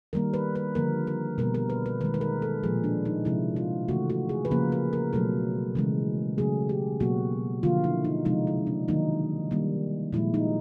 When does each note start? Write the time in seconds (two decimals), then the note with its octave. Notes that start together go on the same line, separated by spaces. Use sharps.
0.13 D#3 G3 A#3 A#4
0.34 B4
0.55 B4
0.75 D3 F3 A#3 A#4
1.07 A#4
1.38 B2 G3 A#3 A#4
1.54 A#4
1.70 B4
1.86 B4
2.01 D#3 G#3 B4
2.14 B4
2.21 A#4
2.42 A4
2.63 A#2 F3 G#3 G#4
2.84 D4
3.05 D#4
3.25 C3 F3 G#3 E4
3.56 F4
3.88 C#3 E3 A3 F#4
4.10 F#4
4.29 G#4
4.45 B4
4.51 C#3 F3 A#3 A#4
4.72 B4
4.93 A#4
5.13 B2 F#3 A3 A4
5.75 C#3 E3 G#3
6.38 C#3 F#3 A3 G#4
6.69 G4
7.00 B2 F#3 A#3 F#4
7.63 D3 F3 A#3 F4
7.84 E4
8.05 D#4
8.25 C3 F3 G#3 D#4
8.47 E4
8.67 D4
8.88 D#3 F#3 A#3 D#4
9.51 D#3 G3 A#3
10.13 A#2 F3 G#3 E4
10.34 D#4